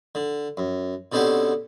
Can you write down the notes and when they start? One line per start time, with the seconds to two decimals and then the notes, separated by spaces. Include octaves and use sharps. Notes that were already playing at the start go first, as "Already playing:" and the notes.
0.15 D3
0.57 F#2
1.12 B2 D3 C4 C#4 G4